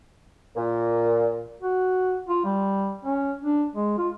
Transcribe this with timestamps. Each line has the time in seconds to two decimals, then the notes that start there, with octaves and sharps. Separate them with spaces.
0.56 A#2
1.61 F#4
2.29 F4
2.45 G3
3.05 C#4
3.42 D4
3.75 G#3
3.98 F4